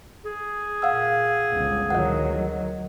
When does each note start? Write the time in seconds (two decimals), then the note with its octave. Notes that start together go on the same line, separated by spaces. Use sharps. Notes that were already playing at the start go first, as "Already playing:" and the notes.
0.25 G#4
0.82 A#2 F5 F#5 E6
1.49 G1 C#2
1.90 D2 D#3 F#3 D#5 F#5